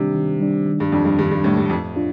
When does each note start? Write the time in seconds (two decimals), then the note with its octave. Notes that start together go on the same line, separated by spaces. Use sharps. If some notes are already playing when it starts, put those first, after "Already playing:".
Already playing: C3 D#3 G3 D4
0.15 D#3
0.40 G3 D4
0.67 D#3
0.80 G2
0.92 F2 G3 D4
1.05 G2
1.18 G2 D#3
1.31 G2
1.44 A2 G3 D4
1.57 G2
1.70 F2 A2
1.96 D4 F4